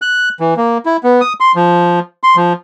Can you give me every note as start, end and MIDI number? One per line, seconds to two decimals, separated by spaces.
0.02 0.29 90
0.40 0.54 52
0.57 0.78 58
0.86 0.97 64
1.04 1.21 59
1.21 1.33 87
1.40 1.52 84
1.56 2.00 53
2.23 2.36 84
2.36 2.53 53